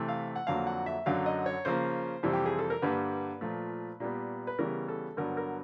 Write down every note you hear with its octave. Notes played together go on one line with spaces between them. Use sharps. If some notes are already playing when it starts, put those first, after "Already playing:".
Already playing: C3 E3 A3 C4
F5
F#5
F2 D3 F#3 A#3 F5
F#5
E5
F#2 D3 F#3 F5
D#5
C#5
C#3 F3 A#3 C5
F2 C3 E3 G3
G4
G#4
A4
A#4
G2 D3 G3 A#3 B4
A#2 F3 A3
A#2 G3 B3
B4
C#3 E3 G3 B3 A#4
A4
G2 D3 F#3 B3 A#4
A#4